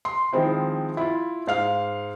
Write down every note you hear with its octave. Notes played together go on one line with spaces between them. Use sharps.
C6
D#3 F3 G#3 C4 E4
E4 F4
G#2 F5 F6